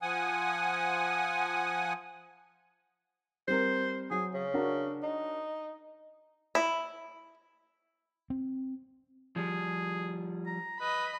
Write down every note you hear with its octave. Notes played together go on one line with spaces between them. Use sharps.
F3 F#5 G#5 D#6
G3 C4 A#4 C5
F#3 G#4
C#3
D4 F#4 A#4
D#4
E4
C4
F3 G3 G#4
A#5
B4 D#5 B5